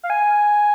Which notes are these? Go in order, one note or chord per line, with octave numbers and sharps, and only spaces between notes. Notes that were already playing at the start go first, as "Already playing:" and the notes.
F5
G#5